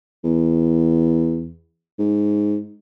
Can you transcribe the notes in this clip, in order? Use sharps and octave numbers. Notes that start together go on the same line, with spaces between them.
E2
G#2